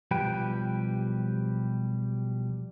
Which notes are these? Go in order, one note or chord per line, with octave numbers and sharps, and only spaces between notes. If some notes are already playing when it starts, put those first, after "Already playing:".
B1 F3 G3 G4 B4 G5